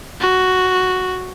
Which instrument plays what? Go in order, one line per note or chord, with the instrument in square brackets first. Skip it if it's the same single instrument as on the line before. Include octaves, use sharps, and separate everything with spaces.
[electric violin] F#4